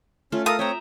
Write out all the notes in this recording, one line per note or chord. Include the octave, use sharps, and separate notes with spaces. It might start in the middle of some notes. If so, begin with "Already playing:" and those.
A3 C#4 F4
A4 A#4 F5 D#6
C4 C#5 E5 G5 A#5